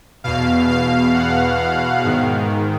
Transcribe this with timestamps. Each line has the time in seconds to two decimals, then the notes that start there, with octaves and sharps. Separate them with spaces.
0.24 E2 B2 F5
0.69 F5
1.14 F#5
2.05 G#2 D#3